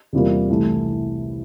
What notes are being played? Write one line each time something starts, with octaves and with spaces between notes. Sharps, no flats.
E2 C3 G3 A#3 F4
C2 C3 E3 A3